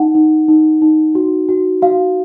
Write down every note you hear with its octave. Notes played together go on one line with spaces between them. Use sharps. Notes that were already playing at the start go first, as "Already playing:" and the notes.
Already playing: D#4 F#5
D#4
D#4
D#4
F#4
F#4
F#4 F5